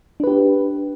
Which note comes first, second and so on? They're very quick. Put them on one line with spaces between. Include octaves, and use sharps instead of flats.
D4 B4 G4